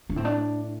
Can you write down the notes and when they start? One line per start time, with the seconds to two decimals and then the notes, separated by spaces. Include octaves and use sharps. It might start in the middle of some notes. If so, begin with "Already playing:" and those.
0.10 D4
0.16 A2 C4
0.25 D4